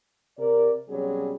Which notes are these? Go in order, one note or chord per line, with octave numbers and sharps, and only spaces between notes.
C3 A#4 D5
B2 F#3 G3 C4 C#4 G#4